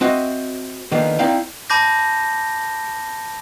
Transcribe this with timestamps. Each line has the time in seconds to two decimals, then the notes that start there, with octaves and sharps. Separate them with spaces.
0.01 C4 F#4 D#5 E5
0.91 D3 D#3 F3 A#3 B3
1.19 C4 D#4 E4 D5 F5 G5
1.70 A5 B5 D6 G6 A#6